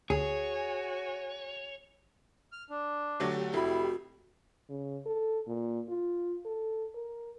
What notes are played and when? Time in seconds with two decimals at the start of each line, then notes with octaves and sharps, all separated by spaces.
0.10 D2 F#4 G#4 C#5 G#5
2.52 F6
2.70 D4
3.20 D3 F#3 A3 G4
3.54 F1 E4 F#4 B5
4.69 C#3
5.06 A4
5.47 A#2
5.88 F4
6.45 A4
6.94 A#4